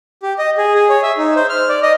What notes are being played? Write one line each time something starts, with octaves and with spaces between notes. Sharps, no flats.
G4
D#5
G#4
G#4
C#5
E5
D#4
C5
F6
D5
D#5